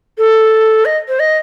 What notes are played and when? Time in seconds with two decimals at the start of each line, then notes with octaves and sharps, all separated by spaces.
0.18 A4
0.85 D#5
1.08 C5
1.20 D#5